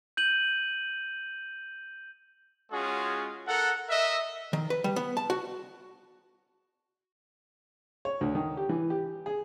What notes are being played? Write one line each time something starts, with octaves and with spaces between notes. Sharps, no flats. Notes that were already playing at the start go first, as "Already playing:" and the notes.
G6 D#7 F#7
G#3 C#4 F4 F#4 G#4
A4 A#4 F#5
A#4 D#5 E5
D#3
B4
G3
B3
A5
F#4
C#5
D2
D#3
G4
E3
G4
G#4